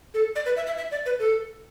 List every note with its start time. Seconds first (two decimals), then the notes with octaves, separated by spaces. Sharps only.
0.14 A4
0.36 D5
0.46 B4
0.56 E5
0.66 E5
0.77 E5
0.91 D5
1.06 B4
1.19 A4